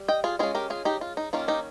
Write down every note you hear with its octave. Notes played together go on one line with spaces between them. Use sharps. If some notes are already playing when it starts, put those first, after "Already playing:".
Already playing: G3
D#5 G5
F4 G#4
G#3 C#4 F4 G#4
G4 A#4
F4 G#4
D#4 G4
F4
D#4
D#3 A#3 C#4 F4
D#4 G4